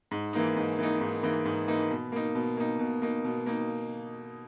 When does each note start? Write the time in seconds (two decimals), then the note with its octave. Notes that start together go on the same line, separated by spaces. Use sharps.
0.11 G#2
0.33 E3 A#3 D#4
0.56 G#2
0.79 E3 A#3 D#4
1.01 G#2
1.23 E3 A#3 D#4
1.45 G#2
1.68 E3 A#3 D#4
1.90 B2
2.12 A#3 D#4
2.35 B2
2.57 A#3 D#4
2.79 B2
3.02 A#3 D#4
3.24 B2
3.46 A#3 D#4